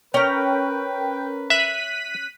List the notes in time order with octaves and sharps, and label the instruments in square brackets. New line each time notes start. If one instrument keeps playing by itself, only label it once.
[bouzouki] C#4 A#5 [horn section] A#4 B4 [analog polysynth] G5
[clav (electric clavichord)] E5 [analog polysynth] F#6 B6 D#7